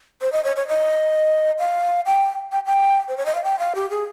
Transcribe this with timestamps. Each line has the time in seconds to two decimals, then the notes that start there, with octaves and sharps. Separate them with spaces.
0.22 C5
0.32 D#5
0.44 C#5
0.56 C#5
0.68 D#5
1.59 F5
2.06 G5
2.52 G5
2.66 G5
3.08 C5
3.17 C#5
3.26 D#5
3.35 F5
3.44 G5
3.59 F5
3.75 G4
3.90 G#4